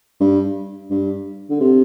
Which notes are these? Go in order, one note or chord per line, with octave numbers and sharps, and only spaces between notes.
G2
G2
D3
C3